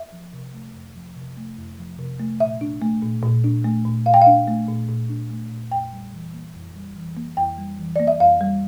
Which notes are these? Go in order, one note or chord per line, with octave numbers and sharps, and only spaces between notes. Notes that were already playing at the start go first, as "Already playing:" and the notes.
Already playing: E5
F3
C3
A3
F2
F3
C3
A3
F2
F3
C3
A3
A#2 E5
D4
A3
A#2
A#2
D4
A3
A#2
A#2 F5
G5
F5
D4
A3
A#2
A#2
D4
A3
A#2
F2 G5
G3
E3
A#3
F2
G3
E3
A#3
F2 G5
G3
E3
A#3 D5
E5
F2 F5
G3